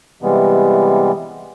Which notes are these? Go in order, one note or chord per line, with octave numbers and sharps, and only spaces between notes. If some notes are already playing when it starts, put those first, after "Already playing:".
C3 E3 G3 G#3 B3